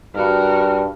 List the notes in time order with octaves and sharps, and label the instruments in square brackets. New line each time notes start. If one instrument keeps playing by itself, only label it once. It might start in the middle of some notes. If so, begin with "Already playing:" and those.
[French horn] G2 [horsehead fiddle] F#4 A#4